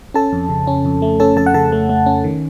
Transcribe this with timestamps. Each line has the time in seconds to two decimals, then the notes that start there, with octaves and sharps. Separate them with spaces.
0.14 C#4 A4 A5
0.33 F2
0.49 C#3
0.67 C#4
0.85 F2
1.02 A3
1.20 C#4 A4 A5
1.36 F2 A4 A5
1.46 F#5
1.54 C#3 A4 A5
1.72 A3
1.89 A3
2.06 C#4
2.24 D#3